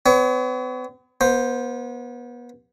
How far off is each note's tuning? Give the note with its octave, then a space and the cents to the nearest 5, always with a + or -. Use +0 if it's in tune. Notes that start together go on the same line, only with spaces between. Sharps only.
B3 +45 C#5 +30
B3 -30 C5 +0